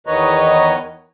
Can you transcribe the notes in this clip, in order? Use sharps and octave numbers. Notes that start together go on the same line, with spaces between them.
E2 D#3 B4 C#5 D#5 A#5